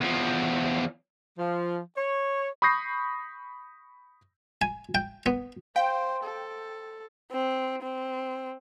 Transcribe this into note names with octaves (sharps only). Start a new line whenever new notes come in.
E2 F3
F3
C#5
B5 C#6 D#6 G6 A#6 C7
G#5
G5
B3
C5 F5 G5
A4
C4
C4